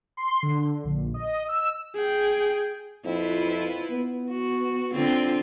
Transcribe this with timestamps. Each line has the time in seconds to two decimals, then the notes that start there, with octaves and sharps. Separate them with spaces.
0.17 C6
0.43 D3
0.84 A#1
1.14 D#5
1.49 E6
1.96 G#4 G5
3.06 F2 E4 F4 B4
3.91 B3
4.30 F#4
4.94 D3 C4 F4